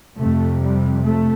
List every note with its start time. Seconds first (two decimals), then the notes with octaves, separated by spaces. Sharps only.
0.18 F2 C3 A3
0.61 G3
1.03 A3